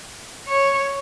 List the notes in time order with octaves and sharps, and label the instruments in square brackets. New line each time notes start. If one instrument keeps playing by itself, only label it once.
[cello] C#5